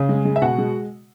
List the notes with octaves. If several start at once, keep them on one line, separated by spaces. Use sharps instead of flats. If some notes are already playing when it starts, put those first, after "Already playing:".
Already playing: C#3 G#4
G#3
G#3
E5
B2 F#4 F#5
G#3